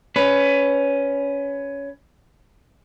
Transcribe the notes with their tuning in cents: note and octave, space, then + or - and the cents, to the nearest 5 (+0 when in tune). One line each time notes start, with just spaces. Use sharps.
C#4 +15 B4 +15